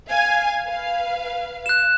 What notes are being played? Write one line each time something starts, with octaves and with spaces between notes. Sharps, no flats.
F5 G#5
B4 F5
F#6 E7